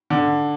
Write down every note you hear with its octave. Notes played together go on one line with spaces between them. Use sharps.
D3